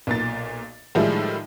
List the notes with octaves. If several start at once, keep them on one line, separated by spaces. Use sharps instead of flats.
B1 A#2 A6
A2 D#3 F3 G3 G#3 E4